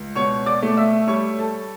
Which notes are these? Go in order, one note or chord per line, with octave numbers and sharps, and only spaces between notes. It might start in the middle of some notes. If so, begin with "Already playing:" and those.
Already playing: C#2
B2 C#5 C#6
D5 D6
A3
E5 E6
G3 C#5 C#6
A4 A5